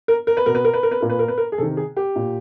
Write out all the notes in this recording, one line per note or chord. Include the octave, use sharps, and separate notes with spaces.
A#4
A#4
B4
B2 A#4
B4
A#4
B4
A#4
B4
A#2 A#4
B4
A#4
B4
A#4
G#4
C3 D#3 A4
G#4
G4
A#2